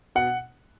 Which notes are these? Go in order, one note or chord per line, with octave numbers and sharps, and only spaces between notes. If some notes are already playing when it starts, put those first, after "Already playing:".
B2 F#5